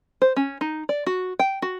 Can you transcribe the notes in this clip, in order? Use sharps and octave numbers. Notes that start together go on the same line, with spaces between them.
C5
C#4
D#4
D5
F#4
G5
F#4